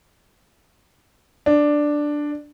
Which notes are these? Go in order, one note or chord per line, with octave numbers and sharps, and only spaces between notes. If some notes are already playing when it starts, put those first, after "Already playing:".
D4